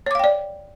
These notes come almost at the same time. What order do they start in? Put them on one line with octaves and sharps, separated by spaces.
C#5 D6 F5 G5 D5